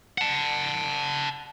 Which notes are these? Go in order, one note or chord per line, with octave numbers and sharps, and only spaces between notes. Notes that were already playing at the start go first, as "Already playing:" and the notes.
F#5 A5